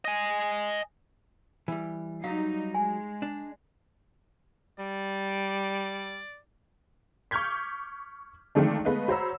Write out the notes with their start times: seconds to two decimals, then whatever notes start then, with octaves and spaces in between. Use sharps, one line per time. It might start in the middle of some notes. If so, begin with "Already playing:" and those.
0.05 D#5 G#5
1.68 E3 G3
2.24 F#3 G3 D#4 F5
2.74 G#3 G#5
3.22 D4
4.79 G3 D5
7.31 C#6 D6 F6 G6 G#6 B6
8.55 D#3 F3 G#3 A3 C4 D4
8.84 G#3 A3 B3 B4 D#5 F5
9.08 F#4 C5 C#5 A#5 B5 E6